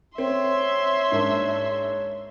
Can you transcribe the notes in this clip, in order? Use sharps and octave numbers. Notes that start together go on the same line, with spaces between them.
C4 C#5 E5 C6
G#2 A#3 D4